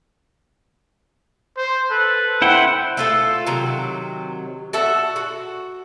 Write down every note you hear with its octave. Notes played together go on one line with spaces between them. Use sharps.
C5
A4 B4
E4 C5 F#5 G5
A3 F4 A4
C3 D#3 F#3 A#5
F#4 A4 E5
F#4